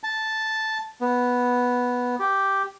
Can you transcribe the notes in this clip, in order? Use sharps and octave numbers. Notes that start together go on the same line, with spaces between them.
A5
B3
G4